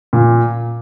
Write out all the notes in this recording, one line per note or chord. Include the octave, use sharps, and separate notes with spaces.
A#2